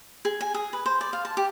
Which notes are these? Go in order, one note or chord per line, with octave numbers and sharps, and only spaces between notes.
G#4
G#5
G#4
B4
C5
D5
F5
A5
G4